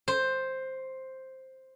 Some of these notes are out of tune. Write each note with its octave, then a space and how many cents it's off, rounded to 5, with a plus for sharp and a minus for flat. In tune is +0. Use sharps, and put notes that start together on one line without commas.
C5 +5